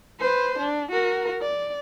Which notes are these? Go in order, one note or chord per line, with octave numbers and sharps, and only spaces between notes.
B4 C5
D4
F#4 A#4
D5